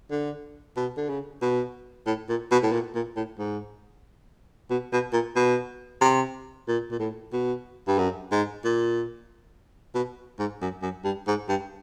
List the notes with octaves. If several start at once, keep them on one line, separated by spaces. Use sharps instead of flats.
D3
B2
D3
C#3
B2
A2
A#2
B2
A2
A#2
A#2
A2
G#2
B2
B2
A#2
B2
C3
A#2
A#2
A2
B2
G2
F#2
G#2
A#2
B2
G#2
F#2
F#2
G2
G#2
G2